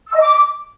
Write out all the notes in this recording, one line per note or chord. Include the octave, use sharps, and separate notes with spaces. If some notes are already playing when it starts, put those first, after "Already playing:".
E6
D#5
D6